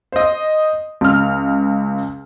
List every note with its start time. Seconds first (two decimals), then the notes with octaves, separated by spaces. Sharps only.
0.12 C5 D#5
1.01 C#2 F6